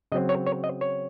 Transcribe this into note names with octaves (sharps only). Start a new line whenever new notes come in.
C#3 F#3 C4 D#5
C#5
C#5
D#5
C#5